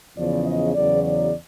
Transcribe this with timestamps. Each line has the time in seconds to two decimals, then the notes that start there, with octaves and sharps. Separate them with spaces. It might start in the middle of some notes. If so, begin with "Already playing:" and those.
0.17 E2 C#3 F3 D5
0.46 D#5
0.75 E2 C#3 F#3 D5
1.04 D5